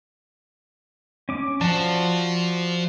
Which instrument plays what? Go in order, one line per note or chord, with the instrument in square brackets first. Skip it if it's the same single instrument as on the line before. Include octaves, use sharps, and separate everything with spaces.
[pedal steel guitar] C#4 D6
[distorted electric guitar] F3 [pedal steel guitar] F#4 D5 A5